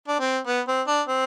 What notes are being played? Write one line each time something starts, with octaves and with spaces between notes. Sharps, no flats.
D4
C4
B3
C4
D4
C4